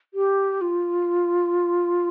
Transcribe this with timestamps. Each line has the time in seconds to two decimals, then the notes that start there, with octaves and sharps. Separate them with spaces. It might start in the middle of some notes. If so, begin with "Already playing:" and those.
0.14 G4
0.61 F4